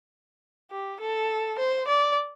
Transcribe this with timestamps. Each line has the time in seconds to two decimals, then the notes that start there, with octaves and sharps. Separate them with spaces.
0.71 G4
1.00 A4
1.59 C5
1.87 D5